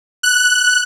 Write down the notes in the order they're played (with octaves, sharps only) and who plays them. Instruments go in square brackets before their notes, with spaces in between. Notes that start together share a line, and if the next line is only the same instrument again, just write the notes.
[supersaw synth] F#6